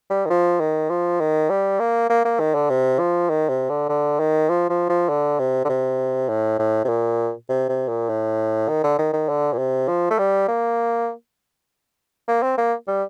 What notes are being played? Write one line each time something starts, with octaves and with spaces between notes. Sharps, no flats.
G3
D#3
F3
D#3
F3
D#3
G3
A#3
A#3
A#3
D#3
D3
C3
F3
D#3
C3
D3
D3
D#3
F3
F3
F3
D3
C3
D3
C3
A2
A2
C3
A#2
C3
C3
A#2
A2
D#3
D3
D#3
D#3
D3
A#2
C3
F3
A3
G3
A#3
A#3
C4
A#3
G3